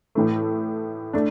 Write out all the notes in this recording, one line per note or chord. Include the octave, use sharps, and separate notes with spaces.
A2 E3 A3
A3 D4